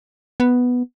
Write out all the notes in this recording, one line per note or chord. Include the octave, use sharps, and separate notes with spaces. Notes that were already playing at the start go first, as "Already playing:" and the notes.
B3